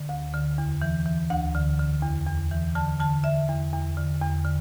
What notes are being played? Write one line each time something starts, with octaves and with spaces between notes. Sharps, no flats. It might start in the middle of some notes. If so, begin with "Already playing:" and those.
Already playing: D3
D2
D3
E2
E3
E3
D2 F#5
D3
D3
E2
E2
E3
D3 A5
D3 A5
D3 E5
E2
E2
D3
E2
D3